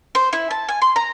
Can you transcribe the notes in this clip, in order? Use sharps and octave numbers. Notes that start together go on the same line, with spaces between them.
C5
E4
A5
G#5
C6
A#5